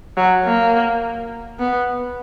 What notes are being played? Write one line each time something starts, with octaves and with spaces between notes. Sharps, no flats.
F#3
A#3
B3